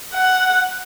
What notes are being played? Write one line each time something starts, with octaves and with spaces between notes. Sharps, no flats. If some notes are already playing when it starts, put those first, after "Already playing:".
F#5